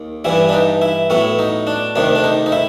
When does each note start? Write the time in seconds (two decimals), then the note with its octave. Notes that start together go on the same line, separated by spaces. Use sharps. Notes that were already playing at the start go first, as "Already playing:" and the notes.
Already playing: D#2
0.25 G2 E3 G3 E4
0.49 D4
0.53 D#4
0.82 E4
1.10 A2 F#3 B3 E4
1.39 D#4
1.67 D4
1.96 D2 C3 D#3 D4
2.15 D4
2.24 D#4
2.46 D#4
2.52 E4